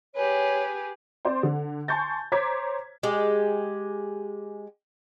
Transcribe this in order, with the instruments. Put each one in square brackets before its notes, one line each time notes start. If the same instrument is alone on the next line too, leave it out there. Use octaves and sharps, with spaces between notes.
[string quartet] G4 G#4 B4 [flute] C#5
[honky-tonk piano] C4 C5 D5 C6
D3
G#5 A5 C6 C#6 G6 A6
C5 C#5 A#5 D6 G#6 B6
[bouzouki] G#3 G4